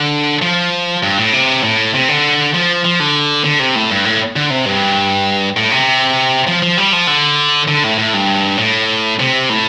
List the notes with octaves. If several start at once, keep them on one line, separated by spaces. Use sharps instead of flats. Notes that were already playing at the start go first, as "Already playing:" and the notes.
Already playing: D3
F3
G2
A2
C3
A2
C3
D3
F3
F3
D3
D3
C3
A2
G2
A2
D3
C3
G2
A2
C3
F3
F3
G3
F3
D3
D3
A2
A2
G2
A2
C3
A2